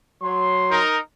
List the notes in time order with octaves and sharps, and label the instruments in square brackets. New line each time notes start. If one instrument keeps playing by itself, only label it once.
[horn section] F#3 C6
[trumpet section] D#4 A#4